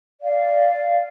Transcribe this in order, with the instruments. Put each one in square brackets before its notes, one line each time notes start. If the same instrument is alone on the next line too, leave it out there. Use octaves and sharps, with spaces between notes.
[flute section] D5 F5